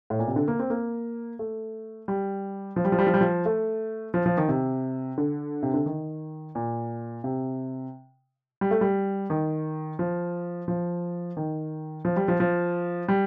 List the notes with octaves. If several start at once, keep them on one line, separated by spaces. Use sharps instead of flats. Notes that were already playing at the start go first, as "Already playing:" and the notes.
A2
A#2
C3
D3
A#3
C4
A#3
A3
G3
F3
G3
F3
G3
F3
G3
F3
A3
F3
F3
D#3
C3
D3
C3
D3
D#3
A#2
C3
G3
A3
G3
D#3
F3
F3
D#3
F3
G3
F3
F3
G3